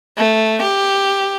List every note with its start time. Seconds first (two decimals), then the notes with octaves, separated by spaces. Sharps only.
0.18 A3
0.63 G4